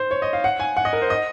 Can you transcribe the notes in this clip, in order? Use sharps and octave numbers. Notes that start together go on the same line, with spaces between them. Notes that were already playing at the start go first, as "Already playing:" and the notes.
Already playing: C5
C#5
D#5
F5
F#5
G#5
F#5
D#5
A#4
C5
D#5